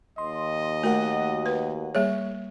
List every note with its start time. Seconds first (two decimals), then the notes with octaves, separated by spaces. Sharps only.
0.18 D#2 D#5 C6
0.83 A3 F#4 A#4 F#5
1.46 B4
1.95 G3 A#3 G#4 C#5